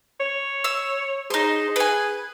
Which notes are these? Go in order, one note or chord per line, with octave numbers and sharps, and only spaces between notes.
C#5
E6
D#4 G#4 C5
B4 G#5